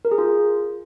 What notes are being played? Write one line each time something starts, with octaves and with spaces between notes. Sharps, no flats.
A#4
G#4
F4